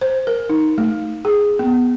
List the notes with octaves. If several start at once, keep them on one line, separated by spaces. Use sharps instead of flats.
C5
A#4
D#4
A3
G#4
B3